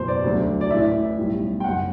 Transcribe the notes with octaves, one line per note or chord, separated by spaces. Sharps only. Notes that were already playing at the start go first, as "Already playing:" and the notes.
Already playing: F#1 E2 B2 F#3 C5
D5
D2 D3 F#3
D5
A1 A2 E3 E5
B1 A2 G3
G5
F#1 F#2 F#3 F#5